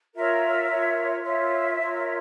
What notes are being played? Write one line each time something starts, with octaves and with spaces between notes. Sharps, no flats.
F4 A#4 C#5 E5
F4 A#4 C#5
F4 A#4 C#5 E5
F4 A#4 C#5